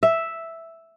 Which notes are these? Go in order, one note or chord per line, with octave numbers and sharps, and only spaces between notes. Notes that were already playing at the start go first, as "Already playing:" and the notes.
E5